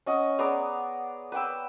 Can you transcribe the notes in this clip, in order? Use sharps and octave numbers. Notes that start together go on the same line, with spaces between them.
C#4 D#5 F#5
B3 G#4 D5 A#5
B4 F#5 G5 E6